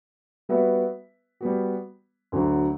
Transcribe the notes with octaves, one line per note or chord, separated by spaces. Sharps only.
G3 B3 F#4 B4 E5
G3 B3 F#4
D2 D3 F#3